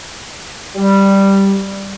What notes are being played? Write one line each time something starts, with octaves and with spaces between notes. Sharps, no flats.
G3